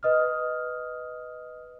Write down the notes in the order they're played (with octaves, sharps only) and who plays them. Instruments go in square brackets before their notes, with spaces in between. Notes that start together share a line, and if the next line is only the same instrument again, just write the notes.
[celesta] B4 D#5 D#6 F6